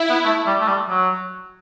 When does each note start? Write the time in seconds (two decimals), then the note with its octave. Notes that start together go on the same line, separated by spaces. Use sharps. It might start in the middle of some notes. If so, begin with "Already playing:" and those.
Already playing: E4
0.09 B3
0.25 A3
0.47 G3
0.60 A3
0.68 G3
0.89 F#3